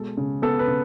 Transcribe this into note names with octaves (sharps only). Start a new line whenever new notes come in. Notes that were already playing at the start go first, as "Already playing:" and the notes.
Already playing: B2 G#3 A4
C#3
B3 A4
B4
C#3